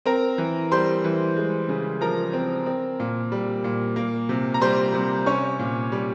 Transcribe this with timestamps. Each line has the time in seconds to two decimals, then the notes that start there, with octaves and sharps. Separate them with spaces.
0.06 C4 A#4 A#5
0.38 E3
0.72 G3 C5 C6
1.04 E3
1.37 G#3
1.69 C#3
2.01 F3 A#4 A#5
2.33 C4
2.66 C4
3.00 A#2
3.32 G3
3.64 A#2
3.96 A#3
4.29 C3
4.54 A#5
4.61 G3 C5 C6
4.94 C3
5.26 C#4 C#5 C#6
5.59 A#2
5.92 G3